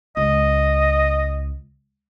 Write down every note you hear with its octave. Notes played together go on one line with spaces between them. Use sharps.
C#2 D#5